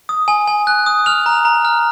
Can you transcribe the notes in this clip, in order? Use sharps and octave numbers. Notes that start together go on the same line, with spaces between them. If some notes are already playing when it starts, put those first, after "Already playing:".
D#6
G#5
G#5
F#6
D#6
F6 F7
A#5
A#5
F6